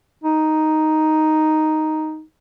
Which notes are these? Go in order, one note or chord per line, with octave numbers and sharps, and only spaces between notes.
D#4